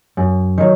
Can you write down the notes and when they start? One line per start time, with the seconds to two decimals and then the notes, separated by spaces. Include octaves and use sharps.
0.17 F#2
0.58 D#3 F#3